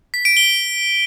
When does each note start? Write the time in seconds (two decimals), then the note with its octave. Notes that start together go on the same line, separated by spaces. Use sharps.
0.14 B6
0.25 D7
0.37 G7